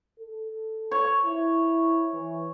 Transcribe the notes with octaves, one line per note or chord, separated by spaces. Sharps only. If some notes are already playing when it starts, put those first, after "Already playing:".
A4
C#5
E4
E3